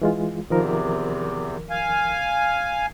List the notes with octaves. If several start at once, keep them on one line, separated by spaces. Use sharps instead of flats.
E3 G#3 F4
E2 C3 D#3 F3 A#4
F5 G#5